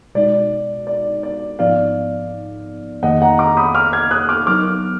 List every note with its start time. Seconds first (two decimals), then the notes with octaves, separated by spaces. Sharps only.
0.15 B2 G#3 D#4 F#4 D5
0.87 D5
1.23 D5
1.59 G#2 F3 B3 D#4 D5 F5
3.03 F2 D#3 A#3 D#4 G#4 D#5 F#5
3.22 F#5 A#5
3.39 A#5 D6
3.57 B5 D#6
3.75 D6 F6
3.93 F6 G#6
4.11 D#6 F#6
4.29 D6 F6
4.47 F#3 B3 D#4 A#4 D6 F6